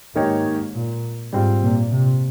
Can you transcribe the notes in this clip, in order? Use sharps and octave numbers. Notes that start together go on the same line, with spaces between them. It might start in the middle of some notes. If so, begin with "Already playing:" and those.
G#2 D#3 A#3 D#4 G4 C#5
G#2
A#2
G#2 G3 C4 F4
A#2
C3